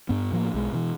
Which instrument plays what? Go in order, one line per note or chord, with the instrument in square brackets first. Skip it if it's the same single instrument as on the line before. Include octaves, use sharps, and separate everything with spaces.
[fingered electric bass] G2 B3
A2 F3 G#3 A#3
B1 G#3
B2 E3